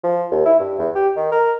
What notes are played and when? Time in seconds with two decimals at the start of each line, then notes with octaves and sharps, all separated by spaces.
0.04 F3
0.31 D#2
0.46 E4
0.59 G2
0.79 E2
0.95 G4
1.16 D#3
1.32 A#4